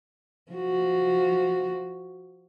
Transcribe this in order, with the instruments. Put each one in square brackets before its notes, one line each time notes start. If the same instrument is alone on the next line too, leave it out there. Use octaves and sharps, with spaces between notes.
[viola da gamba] F3 F#4